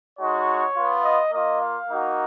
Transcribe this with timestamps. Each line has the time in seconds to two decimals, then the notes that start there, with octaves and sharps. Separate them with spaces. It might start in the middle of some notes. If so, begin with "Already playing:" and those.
0.19 G#3 D#4 F#4 C#5
0.75 B3 F4
1.03 D#5
1.31 A#3 F4 D#5
1.60 F5
1.89 A#3 D#4 F#4